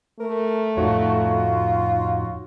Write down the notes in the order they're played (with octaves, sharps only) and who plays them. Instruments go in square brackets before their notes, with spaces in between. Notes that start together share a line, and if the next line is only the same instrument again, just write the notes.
[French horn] A3 [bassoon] A#4
[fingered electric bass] F2 A2 [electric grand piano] D#4 F#4 C#5 [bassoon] F4